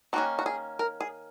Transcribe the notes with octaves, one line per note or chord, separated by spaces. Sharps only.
D#3 A#3 C#4 F#4
F#4
G#4
A#4
G#4